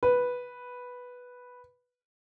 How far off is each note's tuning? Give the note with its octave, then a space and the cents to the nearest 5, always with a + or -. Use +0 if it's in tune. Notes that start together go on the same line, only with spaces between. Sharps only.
B4 -5